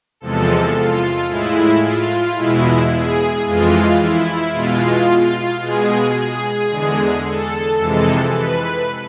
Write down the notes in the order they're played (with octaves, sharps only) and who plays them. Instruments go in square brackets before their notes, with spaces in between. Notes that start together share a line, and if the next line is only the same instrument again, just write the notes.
[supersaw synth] E2 C3 F3 G#3 A4
F4
A2 G#3 E4
F4
E2 B2 G#3 E4
G#4
F2 E3 G#3 F4
E4
B2 G#3 F4
B2 G#3 G#4
E2 D3 G#3
A4
F2 C3 E3 G#3
B4